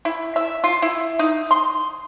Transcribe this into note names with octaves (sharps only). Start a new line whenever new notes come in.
E4
E5
F4
E4
D#4
C6